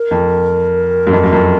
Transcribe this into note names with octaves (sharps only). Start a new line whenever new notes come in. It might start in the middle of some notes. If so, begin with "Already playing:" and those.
Already playing: A#4
F2
F#2
F2
F#2
F2